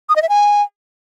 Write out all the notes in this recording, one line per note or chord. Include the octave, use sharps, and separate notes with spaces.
D#6
D#5
E5
G#5